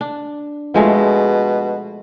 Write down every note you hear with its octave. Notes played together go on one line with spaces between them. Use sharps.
D4
B2 F3 G#3 A3